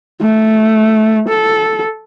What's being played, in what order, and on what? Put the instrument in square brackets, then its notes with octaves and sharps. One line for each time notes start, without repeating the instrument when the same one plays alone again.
[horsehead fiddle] A3
A4